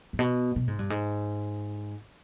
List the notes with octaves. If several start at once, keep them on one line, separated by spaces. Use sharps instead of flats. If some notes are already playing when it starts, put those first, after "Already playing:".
G#2
B2
B2
G#2
G2
G#2